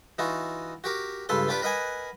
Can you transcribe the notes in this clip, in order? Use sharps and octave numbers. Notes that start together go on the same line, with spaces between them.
E3 D#4 F4 F#4
F#4 G4 A#4
C#2 G2 F4 A4 B4 C6
D4 F4 G4 B4 D5
A#4 B4 D#5 F#5 G#5